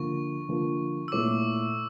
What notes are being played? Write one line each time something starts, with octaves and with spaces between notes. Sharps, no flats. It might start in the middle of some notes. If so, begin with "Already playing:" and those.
Already playing: D3 F3 A#3 C#6
D3 F3 A#3
E6
A#2 A3 E4 A4 C#5 D6